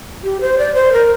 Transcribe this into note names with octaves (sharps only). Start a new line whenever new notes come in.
G4
C5
D5
C5
A#4